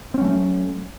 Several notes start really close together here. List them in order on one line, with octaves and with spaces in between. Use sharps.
C4 C#4 F#3 A3